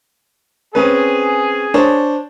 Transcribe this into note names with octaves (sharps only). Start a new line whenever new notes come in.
C4 C#4 G#4 B4
D4 C5 C#5